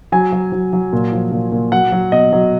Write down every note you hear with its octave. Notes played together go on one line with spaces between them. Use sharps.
F#3 G#5
F#3
F#3
F#3
A#2
F3
A#2
A#2
F#3 F#5
F#3
B2 D#5
F#3